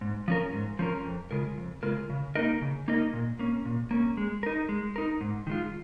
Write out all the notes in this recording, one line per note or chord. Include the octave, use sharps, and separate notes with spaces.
G#2
F3 C#4 A#4
G#2
F3 C#4 A#4
F2
C#3 G#3 F4 A#4
F2
C#3 G#3 F4 A#4
C#3
A#3 D#4 A#4 D#5
C#3
A#3 D#4 A#4 D#5
A#2
A#3 C#4
A#2
A#3 C#4
G#3
D#4 A#4
G#3
D#4 A#4
G#2
D#3 G#3 F4